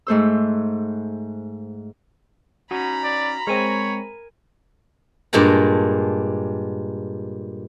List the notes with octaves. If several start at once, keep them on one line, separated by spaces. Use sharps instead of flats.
G#2 A3 C5 E6
C#4 D#4 F#4 A#5 B5
D5
G#3 C4 A#4 C#5 G#5
G2 A#2 G#3 A5 A#5